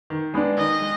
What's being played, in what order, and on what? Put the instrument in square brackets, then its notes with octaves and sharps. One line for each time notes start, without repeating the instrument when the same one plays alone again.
[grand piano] D#3
G#3 B3 D4
[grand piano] D#3 [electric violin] D#5
[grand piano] G#3